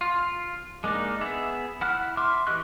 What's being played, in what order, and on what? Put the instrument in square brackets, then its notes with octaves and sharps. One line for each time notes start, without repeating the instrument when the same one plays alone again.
[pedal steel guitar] F4
G#3 A#3 D4 D#4
B3 G#4 E5
E4 F#5 F6 F#6
E5 C6 D6 F6
E3 G4 D#5 C#6 F#6